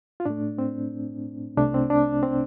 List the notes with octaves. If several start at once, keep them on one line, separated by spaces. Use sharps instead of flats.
F4
A2 A3 D4
C4
C2 C3 A3 D4
C4
D4
C4